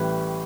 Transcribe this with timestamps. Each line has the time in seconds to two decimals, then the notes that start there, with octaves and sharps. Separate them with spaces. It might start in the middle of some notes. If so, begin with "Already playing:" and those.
Already playing: A1 A2 E3 G3 B4